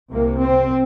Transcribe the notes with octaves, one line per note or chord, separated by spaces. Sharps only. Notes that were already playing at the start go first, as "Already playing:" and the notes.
C2 C3 A#3
C4